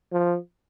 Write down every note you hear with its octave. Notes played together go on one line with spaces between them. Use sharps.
F3